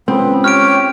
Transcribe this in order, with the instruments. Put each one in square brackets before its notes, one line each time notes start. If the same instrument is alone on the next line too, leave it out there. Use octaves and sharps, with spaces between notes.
[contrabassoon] C#2 [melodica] B3 [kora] C4
[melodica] G4 C#5 [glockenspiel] F6 D7